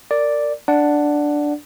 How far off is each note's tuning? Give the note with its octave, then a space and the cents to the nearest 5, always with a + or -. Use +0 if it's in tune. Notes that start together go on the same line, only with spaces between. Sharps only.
A#4 -20 D5 +0
D4 +0 D5 +0 F#5 +0